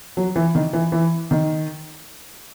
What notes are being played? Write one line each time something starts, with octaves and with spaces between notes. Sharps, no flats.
F#3
E3
D#3
E3
E3
D#3